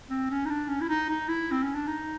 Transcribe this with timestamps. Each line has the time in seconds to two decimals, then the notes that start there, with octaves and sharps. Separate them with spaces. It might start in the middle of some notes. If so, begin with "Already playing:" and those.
0.10 C4
0.30 C#4
0.45 D#4
0.49 D4
0.68 C#4
0.80 E4
0.89 D#4
1.09 D#4
1.28 E4
1.51 C4
1.63 C#4
1.74 D4
1.87 D#4